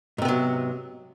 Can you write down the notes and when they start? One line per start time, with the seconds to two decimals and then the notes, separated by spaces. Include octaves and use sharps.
0.18 G#2
0.22 C3
0.25 B3
0.28 F#3